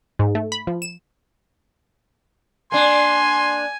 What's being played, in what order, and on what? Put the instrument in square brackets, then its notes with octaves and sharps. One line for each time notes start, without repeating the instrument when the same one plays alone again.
[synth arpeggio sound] G#2
A3
B5
F3
E7
[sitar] A#3 D4 [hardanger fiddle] G#5 [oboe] C6